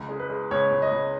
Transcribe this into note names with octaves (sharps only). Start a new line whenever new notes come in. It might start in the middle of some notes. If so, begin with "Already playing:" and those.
Already playing: C#2
G#3
B4
G#3
C#2 C#5
C#2
D#5
C#2